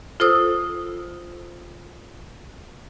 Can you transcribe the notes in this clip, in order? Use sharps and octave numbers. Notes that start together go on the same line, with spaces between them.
F4 A4 C5 D#6 E6